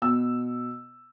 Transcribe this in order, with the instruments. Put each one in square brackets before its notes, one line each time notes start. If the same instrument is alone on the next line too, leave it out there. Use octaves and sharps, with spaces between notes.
[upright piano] B2 E6